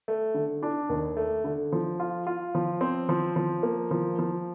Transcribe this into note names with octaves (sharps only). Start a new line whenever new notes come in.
A3
D3
D4
D#2
A3
D3
F3
F4
F4
F3
C4
F3
F3
A#3
F3
F3